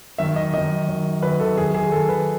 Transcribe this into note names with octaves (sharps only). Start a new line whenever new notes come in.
F#2 D#3 E5
D#5
F#2 D#3 D#5
F#2 D#3
F#2 D#3 B4
A4
F#2 D#3 G#4
G#4
F#2 D#3 A4
B4